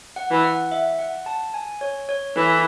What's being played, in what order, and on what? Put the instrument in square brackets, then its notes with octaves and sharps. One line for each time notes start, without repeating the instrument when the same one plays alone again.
[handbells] F#5
[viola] E3
[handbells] F#5
E5
F#5
A5
G#5
C#5
C#5
[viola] E3 [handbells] A4